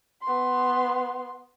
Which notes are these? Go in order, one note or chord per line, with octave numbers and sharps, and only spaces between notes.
B3 C6